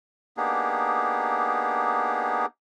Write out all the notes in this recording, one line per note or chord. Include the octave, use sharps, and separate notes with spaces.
A#3 B3 D4 D#4 G4 G#4